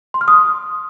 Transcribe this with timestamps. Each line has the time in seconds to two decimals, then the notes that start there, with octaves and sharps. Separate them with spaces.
0.14 C6
0.21 F6
0.28 D#6